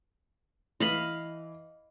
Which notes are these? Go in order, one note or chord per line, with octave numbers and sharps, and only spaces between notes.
E3 D#5 F5 B5